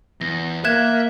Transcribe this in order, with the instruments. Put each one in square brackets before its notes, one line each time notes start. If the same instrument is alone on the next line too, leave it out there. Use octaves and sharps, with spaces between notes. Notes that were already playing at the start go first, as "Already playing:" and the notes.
[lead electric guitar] E2 [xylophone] A#6
[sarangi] A#3 [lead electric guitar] E5 [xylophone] F#6 G#6 E7